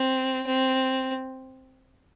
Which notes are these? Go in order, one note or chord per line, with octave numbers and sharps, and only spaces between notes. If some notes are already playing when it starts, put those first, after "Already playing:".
Already playing: C4
C4